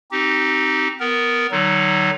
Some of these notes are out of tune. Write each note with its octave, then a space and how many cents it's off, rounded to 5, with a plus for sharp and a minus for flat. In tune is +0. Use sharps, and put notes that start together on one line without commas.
C4 +5 D#4 +0 G4 -25
B3 +5 A#4 +0
D3 +35 F#3 +25 D#4 +0